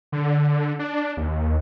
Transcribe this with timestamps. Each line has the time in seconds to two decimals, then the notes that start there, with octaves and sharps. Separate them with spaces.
0.12 D3
0.79 D4
1.17 D#2